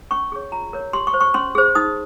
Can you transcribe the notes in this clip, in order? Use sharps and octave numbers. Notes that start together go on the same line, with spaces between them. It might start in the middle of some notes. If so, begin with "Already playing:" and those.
C#4 C#6
G#4 C#5
F4 A#5
A#4 C#5
G4 C6
C#6
C5
C#6
C#4 C6
G#4 C5
D#4 D#6